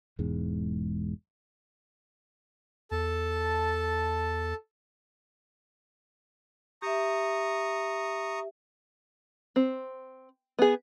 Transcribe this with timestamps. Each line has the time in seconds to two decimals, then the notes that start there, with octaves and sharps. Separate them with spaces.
0.19 E1 E2 G#2 G#3
2.91 E2 A4 A5
6.82 G4 E5 A#5 C#6 D#6
9.56 C4
10.59 B3 G#4